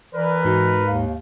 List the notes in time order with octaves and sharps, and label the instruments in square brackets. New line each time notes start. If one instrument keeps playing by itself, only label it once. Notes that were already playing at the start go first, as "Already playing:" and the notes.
[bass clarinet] E3 [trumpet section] A#4 B4 [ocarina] D5
[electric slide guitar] G#2 D#4 [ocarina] F#4
[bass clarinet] D#2 [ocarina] F5